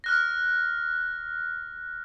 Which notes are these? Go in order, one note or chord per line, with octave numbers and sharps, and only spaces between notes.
F6 F#6 A#6